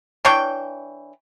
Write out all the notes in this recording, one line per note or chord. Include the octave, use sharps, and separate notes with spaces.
E3 D4 C#5 G5